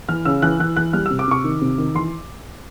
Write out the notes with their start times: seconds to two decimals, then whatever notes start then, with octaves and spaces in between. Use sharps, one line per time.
0.09 E3 F6
0.25 C#3 E6
0.42 E3 F#6
0.59 E3 F#6
0.76 E3 F#6
0.93 G3 F6
1.06 E6
1.10 C3
1.19 D6
1.28 C3 C#6
1.44 D#3
1.61 C3
1.78 D#3
1.95 E3 C6